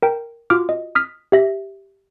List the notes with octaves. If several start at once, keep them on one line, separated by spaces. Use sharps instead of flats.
A#4 G5
F4 F#4 D6 F6
D#5
D#6 F6 B6
G4 E5 A#6